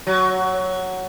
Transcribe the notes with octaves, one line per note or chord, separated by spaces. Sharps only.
F#3